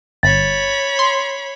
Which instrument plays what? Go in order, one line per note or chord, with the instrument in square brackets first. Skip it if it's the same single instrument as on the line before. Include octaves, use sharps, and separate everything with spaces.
[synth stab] G1 [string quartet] C#5 B5 [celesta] A6
[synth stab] C6